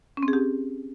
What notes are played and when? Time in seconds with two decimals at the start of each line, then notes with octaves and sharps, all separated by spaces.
0.17 C#4
0.23 C4
0.28 G#4
0.33 G4